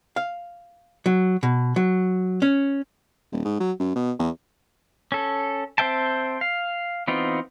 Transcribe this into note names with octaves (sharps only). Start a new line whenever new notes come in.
F5
F#3
B2
F#3
C#4
D#1
G#2
F#3
F#2
B2
E2
C#4 A4
C4 C5 E5 G5 A5
F5
E3 B3 C4 D#4 F4